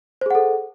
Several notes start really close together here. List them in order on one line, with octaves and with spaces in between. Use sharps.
C5 G#4 F#5 A4